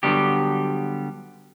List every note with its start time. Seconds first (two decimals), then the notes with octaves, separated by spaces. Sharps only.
0.03 D3 F#3 G3 B3 G4